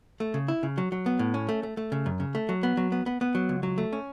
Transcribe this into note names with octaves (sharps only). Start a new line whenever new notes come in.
A3
C#3
E4
C#3
F#3
F#3
B3
A2
C#4
A3
A3
A3
C#3
F#2
C#3
A3
F#3
B3
F#3
B3
B3
B3
F#3
C#2
F#3
A3
C#4